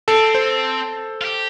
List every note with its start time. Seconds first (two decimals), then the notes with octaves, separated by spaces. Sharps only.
0.08 C4 A4
0.35 C5
1.21 F4
1.25 G4